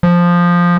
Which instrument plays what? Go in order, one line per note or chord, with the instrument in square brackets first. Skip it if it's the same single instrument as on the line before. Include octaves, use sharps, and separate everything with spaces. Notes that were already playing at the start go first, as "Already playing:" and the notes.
[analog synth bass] F3